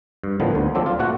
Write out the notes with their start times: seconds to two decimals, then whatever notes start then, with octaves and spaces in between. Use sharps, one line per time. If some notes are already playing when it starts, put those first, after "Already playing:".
0.23 G2
0.40 A2 D3 D#3 F3 B3
0.55 D2
0.75 F3 F#3 C4 A4 D5
0.86 F4
0.99 A#2 A3 F#4 F#5